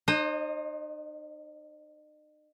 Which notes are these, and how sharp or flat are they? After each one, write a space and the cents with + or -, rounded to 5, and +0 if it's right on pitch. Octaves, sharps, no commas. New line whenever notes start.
D#4 -40 C5 +30 D#5 -5